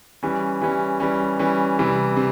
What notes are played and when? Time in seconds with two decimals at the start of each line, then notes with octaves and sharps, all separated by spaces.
0.23 E3 G3 C#4
0.62 E3 G3 C#4
1.00 E3 G3 C#4
1.39 E3 G3 C#4
1.79 C3 E3 G3
2.17 C3